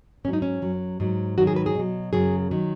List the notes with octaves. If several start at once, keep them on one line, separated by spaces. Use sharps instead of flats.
G#2 F#3 C#4
D#4
C#4
F#2 F#3
G#2 F#3
G#2 D#3 F#3 F#4
G#4
B4
G#4
B2 F#3
F#2 C#3 F#3 G#4
D#3 F#3